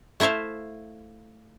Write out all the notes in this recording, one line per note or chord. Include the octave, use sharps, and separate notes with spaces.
A3 E4 C5 E5 F5